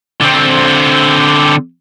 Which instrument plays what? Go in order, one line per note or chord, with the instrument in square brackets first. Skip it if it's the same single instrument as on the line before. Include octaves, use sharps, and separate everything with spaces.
[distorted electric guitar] D3 C4